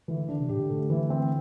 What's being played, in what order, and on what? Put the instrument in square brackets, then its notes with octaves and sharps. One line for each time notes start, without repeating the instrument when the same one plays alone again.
[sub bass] D3 [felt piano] E3
[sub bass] D3 [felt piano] D4
[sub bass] C3
[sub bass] A2 [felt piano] G4
[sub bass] D3
[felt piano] A3
E3
C4